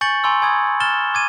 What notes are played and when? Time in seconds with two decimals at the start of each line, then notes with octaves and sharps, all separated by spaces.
0.01 G#5 C#6 G6 A6 C#7 F#7
0.24 G#5 A#5 C6 C#6 E6
0.42 G#5 B5 D#6 G#6
0.80 F6 A6 E7 G7
1.14 D6 G#6 D#7